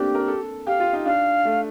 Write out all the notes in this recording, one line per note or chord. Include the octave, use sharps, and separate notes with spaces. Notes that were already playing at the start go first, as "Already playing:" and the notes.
Already playing: A3 A#3 C4 D4 G4
A#4
A4
G4 F5
F4
D#4
D4 F5
A3